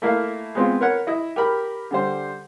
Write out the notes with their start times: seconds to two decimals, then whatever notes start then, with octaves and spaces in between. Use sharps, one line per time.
0.02 A3 A#3 E4 A#4 F5
0.55 G#3 B3 C4 F4
0.81 A#4 B4 C#5 F#5
1.07 E4 D#5
1.36 G4 A#4 B5
1.91 D3 G3 C5